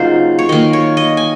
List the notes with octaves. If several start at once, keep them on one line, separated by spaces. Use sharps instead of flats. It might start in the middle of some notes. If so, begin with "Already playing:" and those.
Already playing: C#3 F#3 A#3 D#4 F4 C5
C#5
D#3 A#3 D#5
C#5
D#5
G#5